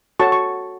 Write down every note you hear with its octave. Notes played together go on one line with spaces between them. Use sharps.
F#4 A4 C#5 A5 C#6
C#6